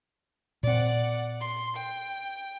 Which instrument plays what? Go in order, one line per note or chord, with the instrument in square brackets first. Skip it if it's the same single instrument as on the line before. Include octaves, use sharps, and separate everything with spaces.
[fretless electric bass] A#2 C4 [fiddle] D5 F#5
[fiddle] C6
G5